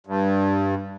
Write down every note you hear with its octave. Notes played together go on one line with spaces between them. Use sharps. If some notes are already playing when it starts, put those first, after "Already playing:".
G2